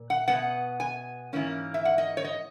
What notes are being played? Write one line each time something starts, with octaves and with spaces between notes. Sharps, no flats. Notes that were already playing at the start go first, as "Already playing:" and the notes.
Already playing: A#2
F#5
B2 G#3 B3 F#5
G#5
G#2 E3 A#3 C#4
E5
F#5
D#5
C#5
D#5